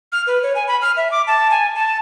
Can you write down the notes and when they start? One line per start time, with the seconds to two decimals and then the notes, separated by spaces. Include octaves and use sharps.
0.12 F6
0.27 B4
0.43 C#5
0.55 G#5
0.68 B5
0.82 F6
0.97 E5
1.11 D6
1.27 A5
1.51 G#5
1.75 A5